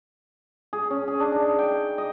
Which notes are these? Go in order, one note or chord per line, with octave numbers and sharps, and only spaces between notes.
G#4
C#4
G#4
D4
D#4
G5
D#5